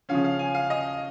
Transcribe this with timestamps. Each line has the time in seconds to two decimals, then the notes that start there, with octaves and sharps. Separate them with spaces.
0.09 C#3 F3 C#4 F5
0.24 F5
0.39 G#5
0.55 F5
0.70 D#5